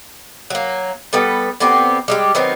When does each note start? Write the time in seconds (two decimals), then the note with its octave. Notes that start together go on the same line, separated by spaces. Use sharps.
0.50 F#3 A#3
1.13 G3 B3 A4 B4
1.60 D3 B3 C4 G4
2.08 G3 G#3 G4
2.35 D#3 F#3 B3 C4